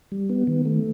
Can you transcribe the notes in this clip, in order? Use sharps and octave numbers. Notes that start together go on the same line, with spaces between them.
G3
B3
D#3
A3